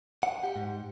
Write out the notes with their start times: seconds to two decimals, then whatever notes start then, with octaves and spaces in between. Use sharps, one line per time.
0.23 F#5
0.43 G4
0.56 G#2